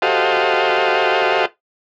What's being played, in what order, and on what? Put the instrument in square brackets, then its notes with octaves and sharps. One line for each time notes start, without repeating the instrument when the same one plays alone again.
[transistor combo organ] F#4 G4 A4 C5 D#5 F5